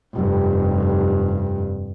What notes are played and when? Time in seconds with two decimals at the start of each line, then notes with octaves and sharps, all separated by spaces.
0.14 F1 G2